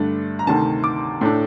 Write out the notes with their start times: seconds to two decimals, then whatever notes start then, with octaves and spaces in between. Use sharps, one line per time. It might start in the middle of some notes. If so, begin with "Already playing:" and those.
Already playing: G2 D3 A3 D4
0.39 A#5
0.47 D2 C3 D#3 A5
0.84 D6
1.21 A2 A3 D4